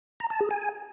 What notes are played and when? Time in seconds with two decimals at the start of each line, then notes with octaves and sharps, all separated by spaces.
0.20 A#5
0.30 A5
0.40 G#4
0.51 G#5